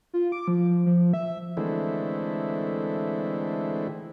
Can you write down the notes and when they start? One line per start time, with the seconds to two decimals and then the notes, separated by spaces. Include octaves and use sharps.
0.14 F4
0.32 D6
0.48 F3
0.86 F3
1.14 E5
1.57 D3 E3 G#3 A3 C4 E4